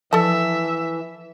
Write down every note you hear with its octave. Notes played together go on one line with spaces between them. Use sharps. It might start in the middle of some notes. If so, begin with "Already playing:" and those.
E3 F3 A4 D5 E5 A5